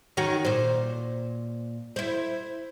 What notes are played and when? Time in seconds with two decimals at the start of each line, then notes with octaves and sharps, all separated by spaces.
0.17 D#3 C#4 F#4
0.45 A#2 C5
1.96 E4 C5